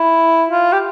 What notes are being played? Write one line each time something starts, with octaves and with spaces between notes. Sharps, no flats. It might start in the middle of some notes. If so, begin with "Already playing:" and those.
Already playing: E4
F4
G4